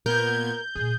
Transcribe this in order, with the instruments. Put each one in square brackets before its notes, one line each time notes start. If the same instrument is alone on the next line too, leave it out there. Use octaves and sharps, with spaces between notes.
[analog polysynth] A#2 B3 G#6 [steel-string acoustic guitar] A#4 [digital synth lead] G6
[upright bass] A#2 D3 [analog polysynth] G#4